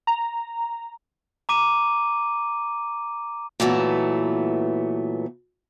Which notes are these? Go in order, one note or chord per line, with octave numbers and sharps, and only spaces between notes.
A#5
A#5 D6 D#7
A#2 E3 F#3 A3 B3